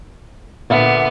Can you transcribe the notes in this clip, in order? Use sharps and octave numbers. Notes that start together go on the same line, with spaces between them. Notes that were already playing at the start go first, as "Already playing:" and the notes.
A#2 D3 B3 E5